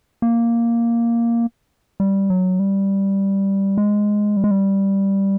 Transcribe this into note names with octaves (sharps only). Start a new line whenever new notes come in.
A#3
G3
F#3
G3
G#3
G3
G#3
G3